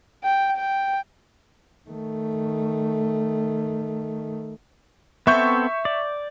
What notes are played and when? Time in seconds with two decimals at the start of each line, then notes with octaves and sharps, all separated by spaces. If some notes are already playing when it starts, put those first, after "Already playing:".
0.24 G5
0.57 G5
1.90 D#3 A3
5.27 B3 C4 A4 E5 C#6 G6
5.85 D5